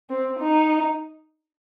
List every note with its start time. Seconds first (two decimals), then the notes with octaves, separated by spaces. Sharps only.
0.10 C4
0.39 D#4